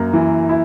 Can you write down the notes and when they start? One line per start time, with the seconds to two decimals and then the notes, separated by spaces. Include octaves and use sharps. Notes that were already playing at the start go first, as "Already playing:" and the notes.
Already playing: F#2 A#3
0.13 E3
0.49 E4